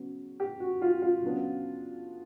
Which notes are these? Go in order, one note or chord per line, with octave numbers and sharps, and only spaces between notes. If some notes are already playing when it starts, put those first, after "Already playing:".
Already playing: C#3 F#3 B3
G4
F#4
F4
F4
C#3 F#3 B3 D4